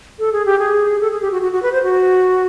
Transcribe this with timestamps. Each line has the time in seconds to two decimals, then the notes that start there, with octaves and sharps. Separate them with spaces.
0.19 A4
0.33 G#4
0.46 G4
0.59 G#4
1.01 A4
1.11 G#4
1.22 G4
1.32 F#4
1.42 F#4
1.52 F#4
1.62 B4
1.73 C5
1.83 F#4